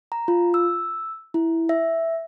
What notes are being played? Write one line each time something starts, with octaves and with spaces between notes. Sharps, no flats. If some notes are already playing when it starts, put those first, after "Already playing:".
A#5
F4
E6
E4
E5